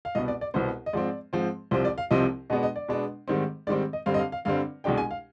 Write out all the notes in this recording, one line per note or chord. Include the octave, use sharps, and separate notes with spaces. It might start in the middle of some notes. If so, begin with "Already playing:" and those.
F5
C2 B2 B3 D#5
D5
D5
C2 B2 B3 C5
D#5
G#2 F3 C4 D5
G#2 F3 C4
C2 C3 F3 C4 C5
D5
F5
C2 C3 F3 C4 D#5
B2 G#3 B3 D4 D#5
D#5
D5
B2 G#3 B3 D4
G#2 D#3 G3 C4
G#2 D#3 G3 C4 D5
D#5
G2 D3 G3 C4 F5
D#5
F5
F5
G2 D3 G3 C4 F5
C2 B2 G#3 D4 G5
G#5
F5